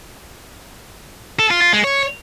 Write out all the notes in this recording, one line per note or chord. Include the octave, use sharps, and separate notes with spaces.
A4
F4
F4
G#3
C#5